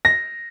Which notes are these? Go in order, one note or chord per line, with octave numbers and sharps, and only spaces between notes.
A#6